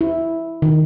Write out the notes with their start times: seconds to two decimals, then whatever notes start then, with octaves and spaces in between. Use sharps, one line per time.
0.01 E4
0.62 D#3